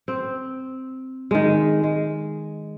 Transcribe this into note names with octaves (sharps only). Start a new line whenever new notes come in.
C4
D#3 G#3
G#3